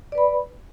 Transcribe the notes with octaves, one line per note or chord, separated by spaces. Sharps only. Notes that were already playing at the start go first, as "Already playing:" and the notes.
B4 D5 B5